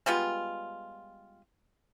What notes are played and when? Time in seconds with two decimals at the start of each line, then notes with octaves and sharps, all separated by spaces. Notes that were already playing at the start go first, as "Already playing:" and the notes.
0.06 G3 G#3 B3 F4